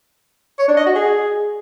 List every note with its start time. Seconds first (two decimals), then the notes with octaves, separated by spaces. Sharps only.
0.59 C#5
0.68 D4
0.77 D#5
0.86 F#4
0.95 G#4